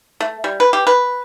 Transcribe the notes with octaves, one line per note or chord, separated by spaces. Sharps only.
A3
G3
B4
G4
B4